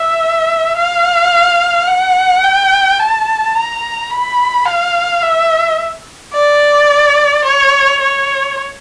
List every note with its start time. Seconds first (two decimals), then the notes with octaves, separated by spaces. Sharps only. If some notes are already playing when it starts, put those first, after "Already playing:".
Already playing: E5
0.77 F5
1.88 F#5
2.44 G5
2.99 A5
3.55 A#5
4.10 B5
4.66 F5
5.22 E5
6.33 D5
7.45 C#5
8.01 C#5